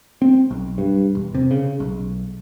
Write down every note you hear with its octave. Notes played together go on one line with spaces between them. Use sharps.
C4
B1
G2
E1
C3
C#3
B1